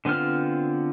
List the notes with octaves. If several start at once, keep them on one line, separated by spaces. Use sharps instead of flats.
D3 B3 C4 F4 F6